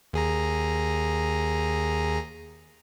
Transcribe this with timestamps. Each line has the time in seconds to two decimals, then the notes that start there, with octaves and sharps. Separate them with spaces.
0.13 D#2 G#4 A#5